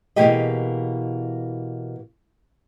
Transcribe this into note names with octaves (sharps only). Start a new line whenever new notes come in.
B2 E3 A#3 G4 G#4 D#5